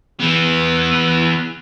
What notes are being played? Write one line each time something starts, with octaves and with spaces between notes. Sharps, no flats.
E3 B3